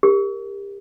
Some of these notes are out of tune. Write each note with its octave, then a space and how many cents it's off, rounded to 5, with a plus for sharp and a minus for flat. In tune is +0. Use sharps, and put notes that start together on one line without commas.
G4 +30 A#4 +0